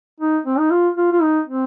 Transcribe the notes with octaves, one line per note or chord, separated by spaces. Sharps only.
D#4
C4
D#4
F4
F4
F4
D#4
C4